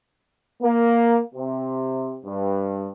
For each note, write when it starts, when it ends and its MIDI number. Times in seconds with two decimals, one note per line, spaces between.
0.61 1.20 58
1.34 2.17 48
2.25 2.90 43